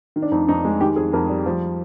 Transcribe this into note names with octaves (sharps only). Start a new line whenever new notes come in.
D#3
D4
F2 D#4
F2 D#4
G#3
D#3 G4
F2 G#4
F2 A#4
G3
F3